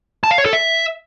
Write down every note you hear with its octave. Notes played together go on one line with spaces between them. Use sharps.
A5
F5
C#5
A4
E5